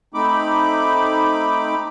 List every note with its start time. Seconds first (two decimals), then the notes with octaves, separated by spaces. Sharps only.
0.14 A3 C4 D#4 B5 D6